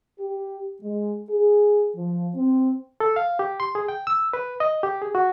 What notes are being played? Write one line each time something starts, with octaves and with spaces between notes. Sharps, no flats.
G4
G#3
G#4
F3
C4
A4
F5
G4
C6
G#4
G5
E6
B4
D#5
G4
G#4
F#4